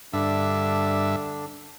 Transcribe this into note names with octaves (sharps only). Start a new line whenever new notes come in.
G2 D3 D4 E5